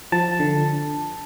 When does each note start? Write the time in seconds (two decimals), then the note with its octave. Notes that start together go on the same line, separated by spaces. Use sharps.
0.12 F3 A5
0.40 D3